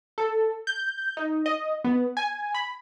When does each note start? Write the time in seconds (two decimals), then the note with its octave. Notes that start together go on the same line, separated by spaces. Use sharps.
0.18 A4
0.67 G6
1.17 D#4
1.46 D#5
1.84 B3
2.17 G#5
2.54 B5